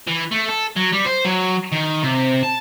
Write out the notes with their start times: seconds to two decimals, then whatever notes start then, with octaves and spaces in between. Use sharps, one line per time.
0.08 E3
0.32 A3
0.49 A4
0.77 F#3
0.93 G3
1.06 C5
1.25 F#3
1.72 D#3
2.02 C3
2.43 A5